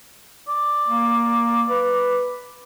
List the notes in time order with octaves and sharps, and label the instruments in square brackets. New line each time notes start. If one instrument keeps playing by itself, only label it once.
[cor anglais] D5
[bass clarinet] A#3
B4